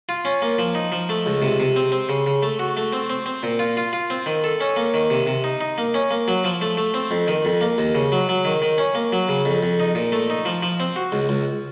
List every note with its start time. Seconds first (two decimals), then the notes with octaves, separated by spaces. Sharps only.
0.09 F4
0.25 C#4
0.42 A#3
0.59 F3
0.75 D#4
0.92 F3
1.09 A3
1.26 C#2
1.42 C3
1.60 C3
1.76 C4
1.92 C4
2.09 C#3
2.27 C#3
2.43 A3
2.59 F#4
2.77 A3
2.93 C4
3.10 C4
3.26 C4
3.43 A#2
3.59 F4
3.77 F4
3.93 F4
4.10 C4
4.26 D#3
4.44 A4
4.61 C#4
4.77 A#3
4.94 D#3
5.10 C3
5.27 C3
5.44 D#4
5.61 D#4
5.78 A#3
5.94 C#4
6.11 A#3
6.28 F#3
6.45 F3
6.62 A3
6.78 A3
6.94 C4
7.11 F2
7.28 D#3
7.45 F2
7.61 A#3
7.78 D#2
7.95 C#3
8.12 F#3
8.29 F#3
8.45 D#3
8.62 D#3
8.78 C#4
8.95 A#3
9.13 F#3
9.29 C#3
9.45 F2
9.63 F2
9.80 D#4
9.95 A#2
10.12 A3
10.30 D#4
10.45 F3
10.63 F3
10.80 C4
10.96 F#4
11.12 C#2
11.29 C#2